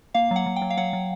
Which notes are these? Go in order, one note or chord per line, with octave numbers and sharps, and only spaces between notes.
A#3 F5
F#3
F#5
F#3
G5
F#3
F5
F#3 F#5
F#3